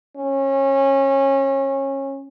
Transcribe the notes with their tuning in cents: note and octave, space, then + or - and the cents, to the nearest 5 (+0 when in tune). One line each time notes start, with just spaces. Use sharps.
C#4 -25